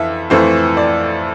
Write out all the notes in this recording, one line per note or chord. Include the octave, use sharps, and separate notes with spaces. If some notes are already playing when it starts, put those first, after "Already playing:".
Already playing: F2 E3 E5
F2 E3 A3 C5
D5